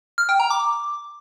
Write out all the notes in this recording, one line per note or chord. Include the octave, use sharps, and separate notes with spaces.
F6
G5
A#5
D6